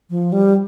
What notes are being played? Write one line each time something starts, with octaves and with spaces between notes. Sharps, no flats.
F3
G3